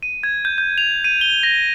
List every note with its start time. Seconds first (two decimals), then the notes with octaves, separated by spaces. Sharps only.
0.03 D#7
0.23 G#6
0.45 G6
0.58 G6
0.78 F7
1.04 D#7
1.21 G7
1.43 A#6